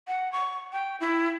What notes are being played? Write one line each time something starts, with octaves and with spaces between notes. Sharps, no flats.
F#5
C#6
G5
E4